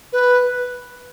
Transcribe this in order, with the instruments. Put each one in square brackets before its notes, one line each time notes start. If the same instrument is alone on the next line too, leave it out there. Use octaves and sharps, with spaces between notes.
[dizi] B4